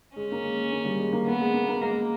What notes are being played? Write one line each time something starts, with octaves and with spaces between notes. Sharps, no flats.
G#3 C#4
A#3
G#3
A#3
G3
G#3
A#3
A#3 B3
G#3
A#3
A#3
G#3 A#3